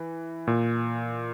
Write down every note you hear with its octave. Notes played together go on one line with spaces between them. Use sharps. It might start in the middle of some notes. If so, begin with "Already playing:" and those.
Already playing: E3
A#2